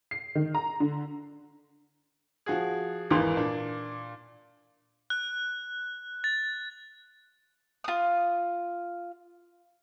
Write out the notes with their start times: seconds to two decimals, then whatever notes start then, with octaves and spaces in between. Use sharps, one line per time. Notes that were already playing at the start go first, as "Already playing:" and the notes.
0.11 C7
0.35 D#3
0.55 A#5
0.80 D3
2.46 F3 F#4 G#4
3.10 G#1 E2 E3 A#3 C6
3.36 A#2 D4
5.10 F#6
6.24 A6
7.84 F4 D#6